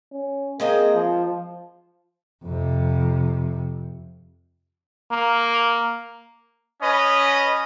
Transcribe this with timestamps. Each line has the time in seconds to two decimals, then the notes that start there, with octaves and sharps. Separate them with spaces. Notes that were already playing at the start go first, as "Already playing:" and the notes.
0.12 C#4
0.60 G#3 A#3 C4 D#5
0.94 F3
2.44 F2 C3
5.11 A#3
6.81 C#4 B4 D#5